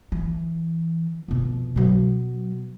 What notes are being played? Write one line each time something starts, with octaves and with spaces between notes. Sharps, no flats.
E3
F2 B2
B2 F#3